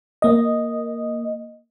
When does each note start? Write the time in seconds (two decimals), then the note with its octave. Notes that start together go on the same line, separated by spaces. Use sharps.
0.22 A#3 D#5